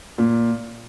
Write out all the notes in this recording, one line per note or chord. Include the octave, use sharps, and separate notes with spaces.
A#2